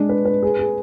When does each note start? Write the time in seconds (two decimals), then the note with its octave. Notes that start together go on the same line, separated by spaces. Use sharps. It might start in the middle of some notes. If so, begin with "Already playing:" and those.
Already playing: G#3 D4
0.09 B4
0.25 B4
0.42 G#4
0.59 G#4